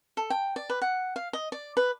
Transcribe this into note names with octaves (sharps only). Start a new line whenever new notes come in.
A4
G5
D5
B4
F#5
F5
D#5
D5
B4